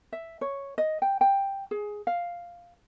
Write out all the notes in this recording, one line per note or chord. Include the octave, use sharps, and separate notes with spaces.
E5
C#5
D#5
G5
G5
G#4
F5